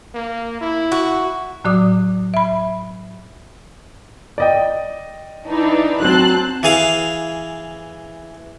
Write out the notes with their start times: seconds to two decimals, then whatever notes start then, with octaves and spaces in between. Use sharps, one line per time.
0.14 A#3
0.61 E4
0.92 F#4
1.64 A2 F#3 F#4 D5 D6 D#6
2.34 E5 B5
4.38 D5 D#5 G5
5.47 E3 D4 D#4
6.02 F#3 C4 A5 C6 F#6
6.63 E3 G#4 F5